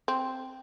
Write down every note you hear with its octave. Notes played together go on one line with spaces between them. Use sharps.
C4